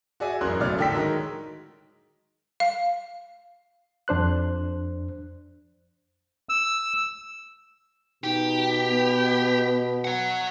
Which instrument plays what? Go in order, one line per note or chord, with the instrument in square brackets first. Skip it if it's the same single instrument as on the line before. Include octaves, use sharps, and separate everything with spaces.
[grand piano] F#4 G#4 D5 E5 G#5
A1 F#2 A#4 C#5 C6 F#6
E1 F#2 C#3 A3 D5 F6
A2 D3 A4 G5 E6 B6
D#3 F#3 G#3 A#4
[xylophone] F5
[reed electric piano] F2 D4 C5 F#6
[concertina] E6
[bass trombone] B2 [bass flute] D#4 [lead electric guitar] G4
[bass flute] B3
[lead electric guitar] C#5 F#5